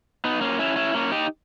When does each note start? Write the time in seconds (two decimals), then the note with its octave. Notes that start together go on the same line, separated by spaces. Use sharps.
0.25 B3 D#4
0.41 A#3 C#4
0.59 C#4 E4
0.76 C#4 E4
0.94 A#3 C#4
1.11 D#4 G4